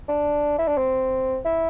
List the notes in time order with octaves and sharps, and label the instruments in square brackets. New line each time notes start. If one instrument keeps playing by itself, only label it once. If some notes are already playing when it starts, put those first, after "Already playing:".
[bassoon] D4
E4
D4
C4
E4